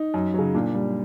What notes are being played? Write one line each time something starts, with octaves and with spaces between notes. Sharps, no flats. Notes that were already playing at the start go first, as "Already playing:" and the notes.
Already playing: D#4
F#2
C#3 F#3
A#2 D4
G3